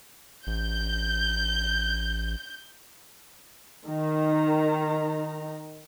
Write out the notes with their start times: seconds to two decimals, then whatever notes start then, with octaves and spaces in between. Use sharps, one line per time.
0.47 A1 G6
3.88 D#3 A#5